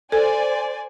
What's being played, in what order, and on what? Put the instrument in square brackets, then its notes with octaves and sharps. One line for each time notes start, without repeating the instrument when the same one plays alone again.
[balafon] A4 [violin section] C5 D5 G#5